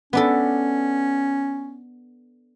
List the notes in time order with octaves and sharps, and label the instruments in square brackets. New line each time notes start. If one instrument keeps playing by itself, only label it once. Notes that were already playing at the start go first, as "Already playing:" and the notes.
[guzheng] B3 D4 A4 [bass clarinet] C#4